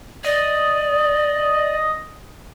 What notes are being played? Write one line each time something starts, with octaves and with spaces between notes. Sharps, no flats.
D5 D#5